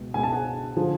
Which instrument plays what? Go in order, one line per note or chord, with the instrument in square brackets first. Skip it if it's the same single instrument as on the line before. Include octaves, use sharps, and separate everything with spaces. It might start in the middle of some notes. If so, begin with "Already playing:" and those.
Already playing: [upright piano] C#2 B2
C#2 B2 G#5
A5
F#5 G#5
D3 F3